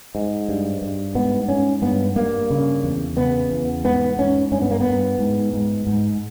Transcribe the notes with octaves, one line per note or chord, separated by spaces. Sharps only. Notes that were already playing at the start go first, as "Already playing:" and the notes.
G#2
G2
G2
G#2 B3
G#2 C#4
G2 B3
G2 A#3
C#3
E2
C#3 B3
E2
G#2 B3
G#2 C#4
G2 C#4
B3
A#3
B3
G2
G#2
G#2
G#2